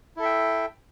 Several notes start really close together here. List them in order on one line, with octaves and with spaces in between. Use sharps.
E4 A4 E5 G5